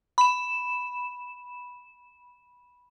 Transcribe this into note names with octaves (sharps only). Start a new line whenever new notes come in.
B5 E7